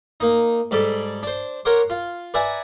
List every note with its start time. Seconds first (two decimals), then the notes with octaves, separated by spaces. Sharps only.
0.20 A#3 D#4
0.71 G#2 G3 A4 D6
1.23 D4 C5
1.65 A#4 C#5 F#5 C6 D6
1.90 F4
2.34 B4 D5 E5 F#5 G#5 A#5